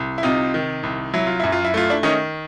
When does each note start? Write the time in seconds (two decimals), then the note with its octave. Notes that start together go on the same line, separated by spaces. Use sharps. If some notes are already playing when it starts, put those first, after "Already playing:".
Already playing: C2
0.18 E4
0.23 C3 D#4 F4
0.54 D#3
0.83 C2
1.14 F#3 E4
1.27 F4
1.40 F#2 E4
1.52 F4
1.64 E4
1.74 A3 F4
1.90 D4 E4
2.03 D#3 C#4 D#4